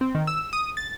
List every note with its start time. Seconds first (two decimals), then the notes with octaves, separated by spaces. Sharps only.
0.01 C4
0.15 D#3
0.27 E6
0.53 D#6
0.77 A6